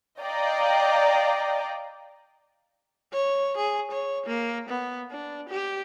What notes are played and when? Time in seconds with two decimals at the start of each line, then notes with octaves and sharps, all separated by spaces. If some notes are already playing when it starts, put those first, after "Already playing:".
0.21 D5 D#5 F5 G5 A#5
3.13 C#5
3.57 G#4
3.92 C#5
4.26 A#3
4.69 B3
5.11 D4
5.49 G4